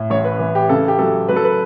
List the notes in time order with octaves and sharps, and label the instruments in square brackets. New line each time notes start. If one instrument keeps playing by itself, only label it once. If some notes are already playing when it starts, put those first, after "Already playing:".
Already playing: [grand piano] A2
A1 C#5
B4
E3
G4
C#3 A4
G4
F#3 A4
F#3 B4
A4
B4